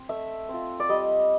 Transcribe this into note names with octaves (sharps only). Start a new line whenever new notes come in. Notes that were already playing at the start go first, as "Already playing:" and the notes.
Already playing: C4
A3 E5
C4 F4
D5
G3 D#5